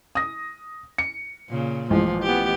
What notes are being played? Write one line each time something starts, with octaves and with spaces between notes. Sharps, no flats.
D#6 A#6
C#7
A#2 C#3
A1 F3 G#3
B3 G4